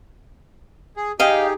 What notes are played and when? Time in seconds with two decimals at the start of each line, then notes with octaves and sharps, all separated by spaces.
0.97 G#4
1.20 D#4 G4 G#4 D#5 F5 G5